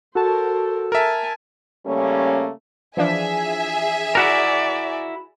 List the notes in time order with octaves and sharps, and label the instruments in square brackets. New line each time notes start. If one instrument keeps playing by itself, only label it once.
[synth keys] F#4 A5 [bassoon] A4 [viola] A#4 C5
[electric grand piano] A#4 E5 [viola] G#5 A5
[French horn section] C#3 G3 A3 A#3 C#4
[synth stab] E3 F3 D4 [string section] G#4 E5 G#5
[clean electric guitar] E4 F#4 A#4 [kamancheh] D5